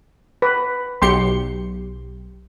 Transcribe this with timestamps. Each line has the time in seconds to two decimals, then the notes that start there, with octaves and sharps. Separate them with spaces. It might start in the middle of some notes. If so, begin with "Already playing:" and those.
0.42 B4
1.02 B1 G4 C6 C#7